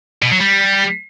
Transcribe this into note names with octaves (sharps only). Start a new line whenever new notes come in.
B2
F#3
G3